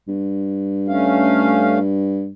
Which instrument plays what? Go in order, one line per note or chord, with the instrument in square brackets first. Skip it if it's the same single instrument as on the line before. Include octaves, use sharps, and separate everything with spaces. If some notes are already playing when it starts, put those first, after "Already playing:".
[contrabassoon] G2
[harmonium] A3 C#4 F5